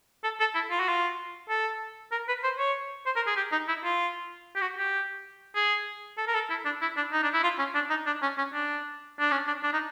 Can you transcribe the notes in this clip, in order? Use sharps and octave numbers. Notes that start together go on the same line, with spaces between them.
A4
A4
E4
F4
F#4
F4
A4
A#4
B4
C5
C#5
C5
A#4
G#4
G4
D#4
E4
F4
G4
F#4
G4
G#4
A4
A#4
A4
E4
D4
E4
D4
D#4
D4
E4
F4
C#4
D4
D#4
D4
C#4
C#4
D4
D4
C#4
D4
D4
D#4